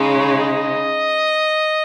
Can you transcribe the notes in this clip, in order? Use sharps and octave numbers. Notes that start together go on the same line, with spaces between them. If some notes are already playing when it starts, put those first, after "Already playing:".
Already playing: C#3 G#3 D#4
C#5
D#5